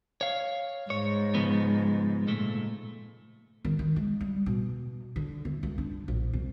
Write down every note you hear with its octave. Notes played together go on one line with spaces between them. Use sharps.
C#5 F5
G#2 C#5
C#3 F3 B3
A#2 A3
D#3
D#3
G#3
G3
B2
D3
A3
C#2
D4
A#1
C2